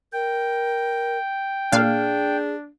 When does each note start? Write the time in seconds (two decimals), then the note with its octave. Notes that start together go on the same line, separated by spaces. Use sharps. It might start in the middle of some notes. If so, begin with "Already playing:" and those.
0.13 A#4 G5
1.72 A#2 D4 G#4 F5